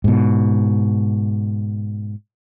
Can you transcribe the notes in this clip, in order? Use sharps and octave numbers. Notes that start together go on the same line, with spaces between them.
G#2 B2